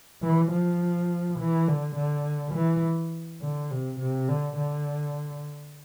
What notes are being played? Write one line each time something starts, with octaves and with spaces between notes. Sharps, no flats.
E3
F3
E3
D3
D3
E3
D3
C3
C3
D3
D3